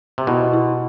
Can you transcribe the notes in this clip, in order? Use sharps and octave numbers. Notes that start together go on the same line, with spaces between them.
C3
B2 E4
E4